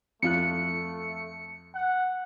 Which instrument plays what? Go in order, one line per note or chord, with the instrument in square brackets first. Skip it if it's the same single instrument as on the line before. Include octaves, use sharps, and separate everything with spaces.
[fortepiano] F2 F4 F#6 [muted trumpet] A3 [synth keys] C#7
[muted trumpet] F#5